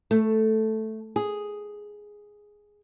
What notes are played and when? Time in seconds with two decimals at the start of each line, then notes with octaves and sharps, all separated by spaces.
0.11 A3
1.16 G#4